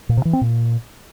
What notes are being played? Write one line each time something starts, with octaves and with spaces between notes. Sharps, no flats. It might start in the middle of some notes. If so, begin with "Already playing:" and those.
A#2
C3
E3
C4
A#2